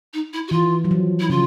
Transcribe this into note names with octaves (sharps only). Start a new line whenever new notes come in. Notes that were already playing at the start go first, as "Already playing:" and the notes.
D#4
E4
F#4
E3 F4
F#3
F3
E4
C#3 F4